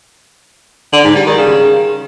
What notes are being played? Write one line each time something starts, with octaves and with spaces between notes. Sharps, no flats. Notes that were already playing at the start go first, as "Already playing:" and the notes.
D3
G#2
G3
D#3
C#3